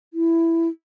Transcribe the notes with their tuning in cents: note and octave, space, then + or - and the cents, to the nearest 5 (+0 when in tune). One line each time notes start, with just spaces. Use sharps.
E4 +10